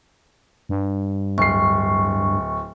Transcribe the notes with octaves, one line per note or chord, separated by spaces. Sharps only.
G2
D1 C#6 C7